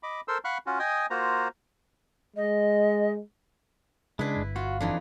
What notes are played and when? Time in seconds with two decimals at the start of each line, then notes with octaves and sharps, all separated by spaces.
0.03 D#5 B5 D6
0.28 A4 A#4 C5 C6 E6
0.45 F5 F#5 B5 C#6 F6 F#6
0.66 C#4 F4 F#4
0.79 D#5 G5 G#5 D#6
1.10 A#3 F4 F#4 C5 A#5
2.36 G#3 D#5
4.19 C#3 G#3 D4 E4 B4
4.37 G1
4.56 F4 F#4
4.81 F2 E3 D4 D#4